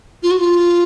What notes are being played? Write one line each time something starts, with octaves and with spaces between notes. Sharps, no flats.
F4
F#4
F4